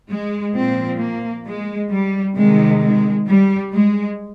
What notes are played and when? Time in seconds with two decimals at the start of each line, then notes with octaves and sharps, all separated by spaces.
0.10 G#3
0.55 A#2 F3 C4
1.00 A#3
1.46 G#3
1.90 G3
2.36 C3 D#3 G#3
2.81 G#3
3.27 G3
3.72 G#3